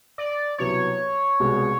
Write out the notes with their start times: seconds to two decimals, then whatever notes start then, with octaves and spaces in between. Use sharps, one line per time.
0.18 D5
0.58 C2 B2 F#3 B3 E4 C#5
1.40 C2 B2 G#3